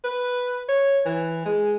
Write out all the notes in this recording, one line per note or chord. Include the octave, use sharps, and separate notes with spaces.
B4
C#5
E3
G#3